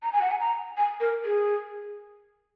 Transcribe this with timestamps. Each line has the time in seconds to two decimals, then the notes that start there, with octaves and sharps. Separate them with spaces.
0.03 A#5
0.13 G#5
0.21 F#5
0.31 G#5
0.40 A#5
0.77 G#5
1.00 A#4
1.25 G#4